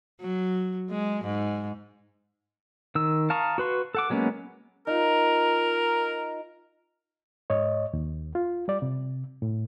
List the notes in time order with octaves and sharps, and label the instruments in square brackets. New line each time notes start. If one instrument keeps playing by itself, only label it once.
[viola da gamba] F#3
G#3
G#2
[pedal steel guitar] D#3 E6
F5 A5 A#5 C#6 D#6
F#4 B4 C6 C#6
A4 F#5 D6
F#3 G#3 A#3 B3 C#4
[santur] D#4 F4 [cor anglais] A#4
[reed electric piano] G#2 C#5 D#5
D#2
F4
G3 D5
C3
A2